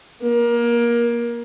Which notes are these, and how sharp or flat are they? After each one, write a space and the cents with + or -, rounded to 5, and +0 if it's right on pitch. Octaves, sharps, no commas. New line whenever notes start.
A#3 +25